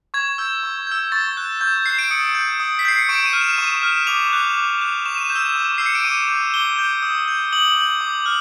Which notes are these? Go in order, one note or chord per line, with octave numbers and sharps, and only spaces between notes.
C#6 G#6
E6 G6
C#6
E6 G6
C#6 A6
F#6
C#6 G6
F#6 C7
D7
D#6 C#7
G6
D#6
B6
G6 C7
C#7
C#6 D7
D#7
F6
E7
C#6 D#7
F6
D6 F7
F#6
D6
F#6
C#6 E7
D#7
G6 E7
E6
C#6
E6 G6 C7
C#7
D7
D6 D#7
G6
D6 G7
G6
D#6
G6
D#6 F#7
G6
D6
F6